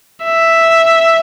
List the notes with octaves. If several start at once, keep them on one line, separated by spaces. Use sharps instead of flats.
E5